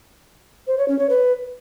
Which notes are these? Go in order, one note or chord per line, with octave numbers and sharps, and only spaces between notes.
C5
C#5
C#4
C#5
B4